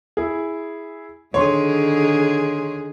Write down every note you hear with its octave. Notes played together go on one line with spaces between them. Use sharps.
E4 G#4
D3 D#3 G#4 C#5 C6 C#6